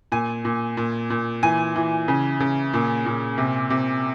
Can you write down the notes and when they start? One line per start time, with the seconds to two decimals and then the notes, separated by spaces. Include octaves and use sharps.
0.12 A#2 G#5
0.45 A#2
0.77 A#2
1.10 A#2
1.43 E3 G#5
1.76 E3
2.08 C#3
2.40 C#3
2.73 A#2
3.06 A#2
3.38 C3
3.70 C3